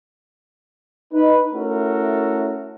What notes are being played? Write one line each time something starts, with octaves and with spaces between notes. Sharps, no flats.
D#4 B4
A3 C#4 E4 F#4 A4 A#4